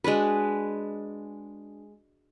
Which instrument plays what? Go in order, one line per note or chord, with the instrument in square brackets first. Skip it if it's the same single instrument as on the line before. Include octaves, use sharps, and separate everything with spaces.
[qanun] G#3 D4 F#4 B4